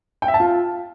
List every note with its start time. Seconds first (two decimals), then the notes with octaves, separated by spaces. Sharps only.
0.22 G5
0.28 E5
0.34 A5
0.40 F4